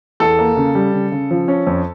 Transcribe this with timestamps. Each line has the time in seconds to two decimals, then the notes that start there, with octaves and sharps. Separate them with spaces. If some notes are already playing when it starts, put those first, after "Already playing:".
0.20 E2 A4
0.39 A#3
0.57 C#3
0.75 G3
0.94 C#3
1.12 C#3
1.31 F3
1.48 C#4
1.67 F2